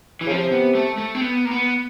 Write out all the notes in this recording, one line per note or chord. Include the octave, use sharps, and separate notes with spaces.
E3
C#3
C3 F3
B3
A3
A3
C4
B3
A#3
B3